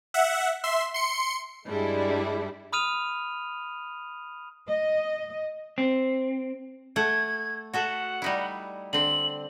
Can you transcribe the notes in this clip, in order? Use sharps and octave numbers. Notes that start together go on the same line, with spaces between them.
E5 F#5
E5 C6
C6 C#7
G2 G3 G#3 D4 E4
B5 D#6 F6 D#7 F7
D#5
C4
A3 A4 F#5 G#6
F#4 A4 E5 F#5
G3 D#4 E4
D3 C4 F#7